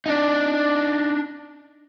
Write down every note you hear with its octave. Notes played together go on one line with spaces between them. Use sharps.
D4 D#4